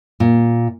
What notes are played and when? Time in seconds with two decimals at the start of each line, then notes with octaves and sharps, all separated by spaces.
0.20 A#2